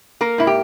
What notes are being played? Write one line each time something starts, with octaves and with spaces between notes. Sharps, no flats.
A#3 A#4
G#2 E4
G4